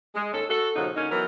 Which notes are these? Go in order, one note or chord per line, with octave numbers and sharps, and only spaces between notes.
G#3
D#2 C#4 A4
F#4 A4
A#2 C#3 F3 D#4 F#4
D3 A#3 C#4 D#4
E3 F#3 B3 A#4